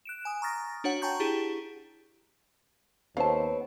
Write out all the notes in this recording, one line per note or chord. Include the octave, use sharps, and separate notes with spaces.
F#6 D7 E7
G#5 D#6
A#5 C#6 D#6 F6 A6 A#6
D4 F#4 C#5 F#5
G5 A5 A#5 C#6 G6
D4 E4 G4 G#4
D#2 B3 C4 C#5 F5 A5